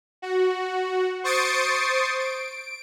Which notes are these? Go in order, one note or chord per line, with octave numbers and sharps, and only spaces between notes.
F#4
C5 C#6 D#6 A6 C7 D7
D7